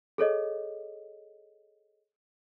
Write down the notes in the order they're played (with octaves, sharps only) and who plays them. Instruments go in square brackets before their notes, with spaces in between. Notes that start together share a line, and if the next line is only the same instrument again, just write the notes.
[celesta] G#4 A4 C#5 D#5